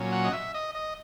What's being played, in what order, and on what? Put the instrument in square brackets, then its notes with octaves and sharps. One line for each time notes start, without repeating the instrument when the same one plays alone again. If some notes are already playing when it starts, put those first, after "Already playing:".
Already playing: [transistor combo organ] A#2 F#3 C#4
F#5
D#5
E5
D#5
D#5